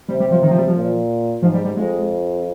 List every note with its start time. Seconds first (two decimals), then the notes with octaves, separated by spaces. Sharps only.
0.09 C3 G3
0.20 G3
0.31 F3
0.42 D#3
0.51 F3
0.59 G3
0.68 F3
0.76 A#2
1.42 G#2 F3
1.54 G3
1.65 G3
1.76 F2 G#3